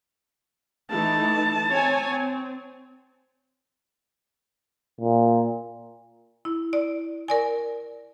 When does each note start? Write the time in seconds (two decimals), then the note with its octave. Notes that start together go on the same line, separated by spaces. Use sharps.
0.91 E3 A3 D#4 A5
1.70 C4 C#5 G#5
2.11 C4
5.01 A#2
6.45 E4
6.73 D5
7.28 A#4 D5 G#5